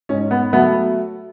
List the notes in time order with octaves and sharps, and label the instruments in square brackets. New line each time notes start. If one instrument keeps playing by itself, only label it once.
[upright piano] G#2 [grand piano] C#4
[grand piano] B3
[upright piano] F#3 A3 [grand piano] B3